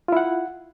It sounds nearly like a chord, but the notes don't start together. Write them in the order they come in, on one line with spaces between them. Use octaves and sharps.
F4 E4 F#5